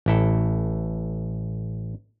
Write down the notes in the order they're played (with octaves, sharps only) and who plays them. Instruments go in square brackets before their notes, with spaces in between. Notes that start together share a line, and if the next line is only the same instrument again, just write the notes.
[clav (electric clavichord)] A1 E4 A4